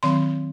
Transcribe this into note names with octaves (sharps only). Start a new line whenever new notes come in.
D#3 F#3 C4 C6